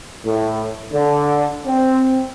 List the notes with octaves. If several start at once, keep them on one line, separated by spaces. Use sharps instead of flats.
A2
D3
C4